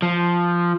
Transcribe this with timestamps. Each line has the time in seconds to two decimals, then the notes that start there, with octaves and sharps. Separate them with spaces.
0.02 F3